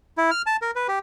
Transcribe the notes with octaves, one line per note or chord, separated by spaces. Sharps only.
E4
F6
A5
A#4
B4
G4